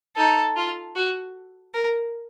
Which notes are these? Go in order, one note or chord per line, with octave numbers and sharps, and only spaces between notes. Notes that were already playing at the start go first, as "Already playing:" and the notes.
D#4 A4
F4
F#4
A#4